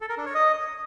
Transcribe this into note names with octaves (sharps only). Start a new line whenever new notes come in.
A4
A#4
D4
C#5
D#5